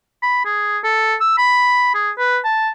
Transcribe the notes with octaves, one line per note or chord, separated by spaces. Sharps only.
B5
G#4
A4
E6
B5
G#4
B4
A5